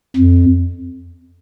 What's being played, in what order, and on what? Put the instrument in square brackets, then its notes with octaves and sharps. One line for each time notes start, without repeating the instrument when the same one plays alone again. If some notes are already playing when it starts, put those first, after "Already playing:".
[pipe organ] F2